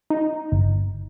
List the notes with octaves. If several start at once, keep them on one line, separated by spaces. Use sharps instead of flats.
D#4
G1